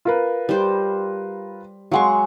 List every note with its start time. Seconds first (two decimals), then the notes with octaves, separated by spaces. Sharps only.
0.05 F4 A#4 B4
0.49 G3 C5
1.92 F#3 G#3 F5 F#5 C6 C#6